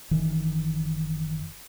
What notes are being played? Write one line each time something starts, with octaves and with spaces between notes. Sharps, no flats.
F#1 D#3 E3